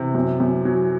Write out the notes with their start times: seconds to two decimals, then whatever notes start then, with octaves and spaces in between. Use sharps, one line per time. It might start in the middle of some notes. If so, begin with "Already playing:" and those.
Already playing: C3 E3
0.15 F#2
0.40 F#2
0.65 F#3